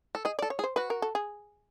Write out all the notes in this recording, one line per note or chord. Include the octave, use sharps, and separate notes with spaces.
A4
G#4 D#5
A4 D5
C#5
G#4
C5
F#4 B4
A#4
A4
G#4